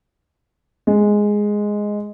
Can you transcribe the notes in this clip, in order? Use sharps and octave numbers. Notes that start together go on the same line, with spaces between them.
G#3